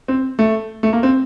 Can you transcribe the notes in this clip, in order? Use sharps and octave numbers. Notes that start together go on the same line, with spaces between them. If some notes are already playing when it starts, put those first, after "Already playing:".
C4
A3
A3
A#3
C4